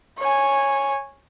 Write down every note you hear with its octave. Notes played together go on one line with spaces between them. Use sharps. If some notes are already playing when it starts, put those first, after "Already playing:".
C#5 G#5